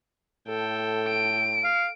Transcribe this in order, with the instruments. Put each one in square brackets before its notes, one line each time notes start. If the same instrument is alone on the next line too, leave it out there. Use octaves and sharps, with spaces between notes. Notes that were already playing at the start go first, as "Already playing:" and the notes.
[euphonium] A2 [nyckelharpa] A4 G5
[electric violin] D7
[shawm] F5